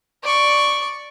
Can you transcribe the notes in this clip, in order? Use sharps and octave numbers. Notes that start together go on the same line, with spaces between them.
D5 C#6